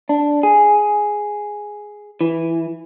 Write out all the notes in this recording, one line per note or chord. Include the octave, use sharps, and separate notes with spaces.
D4
G#4
E3